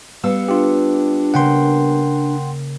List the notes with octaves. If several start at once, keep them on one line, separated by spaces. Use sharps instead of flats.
G3 B3 F5 E6 C#7
D4 F4 G4
C#3 A#3 F#5 G5 C6